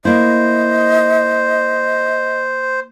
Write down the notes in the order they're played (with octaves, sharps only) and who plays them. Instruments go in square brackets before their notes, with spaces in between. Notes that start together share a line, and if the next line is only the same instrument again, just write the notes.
[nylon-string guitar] A#3 E4 [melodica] C5 [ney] D#5